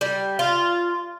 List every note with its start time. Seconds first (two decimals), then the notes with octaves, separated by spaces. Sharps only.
0.01 G3
0.39 F4